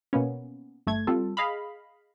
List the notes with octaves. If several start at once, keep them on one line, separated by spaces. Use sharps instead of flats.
B2 A#3 B3 C#4
G1 A3 G#6
G3 C4 F4 A4
G#4 D#5 F5 B5